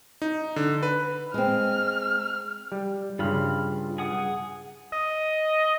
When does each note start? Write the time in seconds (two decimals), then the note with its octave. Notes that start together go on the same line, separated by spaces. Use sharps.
0.22 D#4
0.56 D3
0.83 B4
1.34 G#3 C4 F6
2.72 G3
3.19 G2 C#3 F4 B5 F6
3.98 G#4 F#5 D#6
4.92 D#5